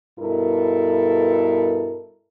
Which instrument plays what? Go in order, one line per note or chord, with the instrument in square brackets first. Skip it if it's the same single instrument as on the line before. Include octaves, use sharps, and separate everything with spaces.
[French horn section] G2 B2 E4 A4 A#4